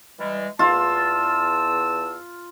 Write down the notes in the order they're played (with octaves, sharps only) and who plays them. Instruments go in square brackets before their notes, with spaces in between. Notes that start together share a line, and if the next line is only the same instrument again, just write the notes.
[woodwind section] E3 G3 G#3
[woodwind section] E2 A5 E6 [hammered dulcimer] F4